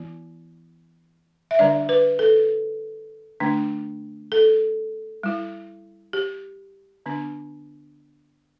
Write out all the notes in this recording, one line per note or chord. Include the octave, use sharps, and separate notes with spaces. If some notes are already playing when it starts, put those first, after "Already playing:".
Already playing: E3 B3 E4
E5
D3 G3 D4 D5
B4
A4
D3 A3 D4
A4
G3 E4
G4
D3 B3 D4